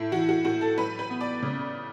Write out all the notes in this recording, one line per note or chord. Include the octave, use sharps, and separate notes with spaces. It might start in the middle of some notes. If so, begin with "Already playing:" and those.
Already playing: A2 E4
E3 F#4
F#4
A2 F#4
A4
F#3 B4
B4
B3
D5
C#3